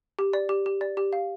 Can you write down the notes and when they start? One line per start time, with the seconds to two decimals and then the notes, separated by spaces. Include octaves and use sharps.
0.19 G4
0.33 D5
0.49 G4
0.66 G4
0.81 D5
0.97 G4
1.13 F5